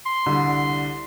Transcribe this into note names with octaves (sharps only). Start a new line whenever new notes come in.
C6
C2 D3